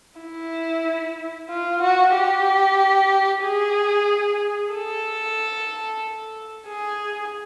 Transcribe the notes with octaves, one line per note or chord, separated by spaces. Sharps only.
E4
F4
F#4
G4
G#4
A4
G#4